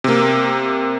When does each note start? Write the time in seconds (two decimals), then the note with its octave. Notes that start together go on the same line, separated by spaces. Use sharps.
0.04 C3 A#3